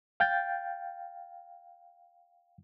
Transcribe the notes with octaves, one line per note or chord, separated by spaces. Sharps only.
F5 G5 G6 A6